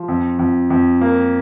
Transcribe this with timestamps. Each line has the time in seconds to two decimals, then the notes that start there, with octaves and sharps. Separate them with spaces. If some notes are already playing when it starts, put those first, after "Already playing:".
Already playing: F3
0.08 F2
0.39 F2
0.70 F2
1.01 A#3